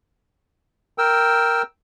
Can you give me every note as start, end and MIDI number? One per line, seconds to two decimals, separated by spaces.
0.98 1.62 70
0.98 1.62 79
0.98 1.62 88